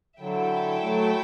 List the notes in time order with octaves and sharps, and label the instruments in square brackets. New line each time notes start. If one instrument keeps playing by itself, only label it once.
[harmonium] D3 F#3 [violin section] E4 A4 E5 G5
[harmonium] F#3 A3